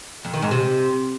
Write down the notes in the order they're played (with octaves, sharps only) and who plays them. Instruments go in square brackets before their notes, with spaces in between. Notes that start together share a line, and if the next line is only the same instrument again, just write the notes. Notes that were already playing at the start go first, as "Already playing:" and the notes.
[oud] F2
D#3
G#2
C3